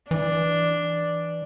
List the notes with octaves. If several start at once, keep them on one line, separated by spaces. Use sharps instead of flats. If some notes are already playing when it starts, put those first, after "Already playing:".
E3 D4